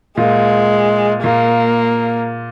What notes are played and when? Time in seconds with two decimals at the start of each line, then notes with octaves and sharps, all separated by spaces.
0.17 A#2 G#3
1.23 A#2 A#3